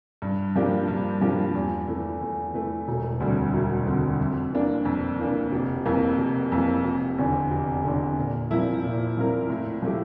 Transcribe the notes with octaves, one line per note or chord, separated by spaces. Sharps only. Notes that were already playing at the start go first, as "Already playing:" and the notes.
G2
F3 A#3 D4 G4
G2
F3 A#3 D4 G4
E2
E3 A3
E2
E3 A3
E1
D2 D3 G3 C4
E1
D2 D3 G3 C4
F2
E3 A#3 D4
F2
E3 A#3 D4
F1
F2 E3 A#3
F1
F2 E3 A#3
F1
E2 D3
F1
E2 D3
A#2
F3 C4 E4 A#4
A#2
F3 C4 E4 A#4
A2
F3 A3 E4 G4